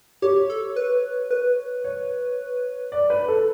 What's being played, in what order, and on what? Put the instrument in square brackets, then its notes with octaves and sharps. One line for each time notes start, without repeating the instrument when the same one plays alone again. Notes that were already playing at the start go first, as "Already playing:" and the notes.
[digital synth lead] G4 [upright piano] C#5
[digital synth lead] A4
B4
B4
[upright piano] C#5
D5
B4
A4